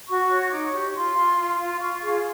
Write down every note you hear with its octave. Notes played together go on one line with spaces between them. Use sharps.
F#4 C#6
C#5
D#4 D6
C#6
G4
C#6
F4 C6
F4
F4
F4
C6
F4 C#6
G#4